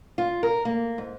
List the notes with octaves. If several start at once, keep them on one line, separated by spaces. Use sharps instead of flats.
F4
A#4
A#3
G#2